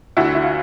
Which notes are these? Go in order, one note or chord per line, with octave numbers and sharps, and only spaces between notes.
D2 E4 F#4
E4
F4